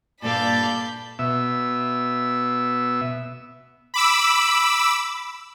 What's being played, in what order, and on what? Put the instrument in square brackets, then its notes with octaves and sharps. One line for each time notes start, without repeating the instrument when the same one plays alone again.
[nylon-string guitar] G2 A#2 [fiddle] A4 F5 [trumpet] D5 [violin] B5 G6
[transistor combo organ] B2 E5
[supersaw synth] B5 D6 E6